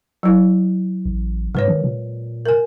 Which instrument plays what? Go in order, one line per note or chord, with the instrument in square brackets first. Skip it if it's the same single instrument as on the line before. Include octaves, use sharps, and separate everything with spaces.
[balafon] F#3 E4
[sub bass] A1
[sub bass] G#2 [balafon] G#3 B4 C#5
[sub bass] D#3
A#2
[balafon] A#4 G#5